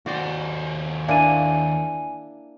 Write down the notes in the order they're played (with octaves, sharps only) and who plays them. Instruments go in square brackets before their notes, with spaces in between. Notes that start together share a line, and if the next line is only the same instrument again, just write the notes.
[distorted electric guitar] D#2 C5 [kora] F#4 D5 G5
[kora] A#3 D4 E4 [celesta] G#5 D#7